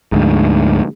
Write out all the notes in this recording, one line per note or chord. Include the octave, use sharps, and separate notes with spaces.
D2 G#2